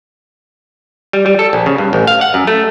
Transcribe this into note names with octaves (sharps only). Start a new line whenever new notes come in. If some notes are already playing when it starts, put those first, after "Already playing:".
G3
G3
A4
A#1
C#3
G2
A1
F5
F#5
F#2
A3